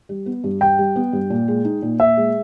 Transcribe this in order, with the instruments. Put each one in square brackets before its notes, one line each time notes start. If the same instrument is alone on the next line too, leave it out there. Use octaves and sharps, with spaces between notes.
[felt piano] G3
B3
G2
[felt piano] G2 [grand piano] G5
[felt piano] G3
B3
G2
A#2
G#3
D#4
A#2
[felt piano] A#2 [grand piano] E5
[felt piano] G#3